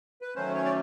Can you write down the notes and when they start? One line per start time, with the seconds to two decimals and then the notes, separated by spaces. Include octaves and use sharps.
0.22 B4
0.35 D#3 F#3 A3 C#4 C5
0.55 C#5
0.65 D5